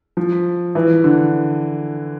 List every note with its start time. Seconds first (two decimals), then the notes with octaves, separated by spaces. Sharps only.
0.17 F3
0.75 E3
1.04 D3